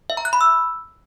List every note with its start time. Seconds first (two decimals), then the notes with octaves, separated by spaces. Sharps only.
0.10 E5
0.17 A#5
0.25 F#6
0.33 B5
0.41 E6